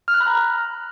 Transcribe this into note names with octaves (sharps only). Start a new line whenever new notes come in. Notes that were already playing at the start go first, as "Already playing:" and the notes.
F6
F#6
B5
A#5